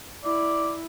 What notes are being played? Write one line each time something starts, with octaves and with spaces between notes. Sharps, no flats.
E4 D5